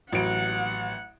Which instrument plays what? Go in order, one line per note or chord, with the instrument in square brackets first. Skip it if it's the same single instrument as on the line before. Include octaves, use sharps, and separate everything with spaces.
[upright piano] A1 F#3 D7 [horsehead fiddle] F#5